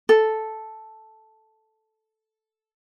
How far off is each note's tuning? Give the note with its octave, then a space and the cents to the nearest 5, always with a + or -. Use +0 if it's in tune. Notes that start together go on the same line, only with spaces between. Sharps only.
A4 -5